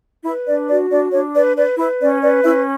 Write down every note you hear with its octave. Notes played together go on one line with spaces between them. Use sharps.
E4 B4 E5
D4 D5
F#4 D5
D4 D5
D4 C#5
B4 D5
B4 D5
E4 B4 E5
C#4 D5
B4 D5
C#4 E4 E5